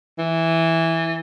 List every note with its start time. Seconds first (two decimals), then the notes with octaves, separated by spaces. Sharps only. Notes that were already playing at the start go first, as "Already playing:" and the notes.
0.19 E3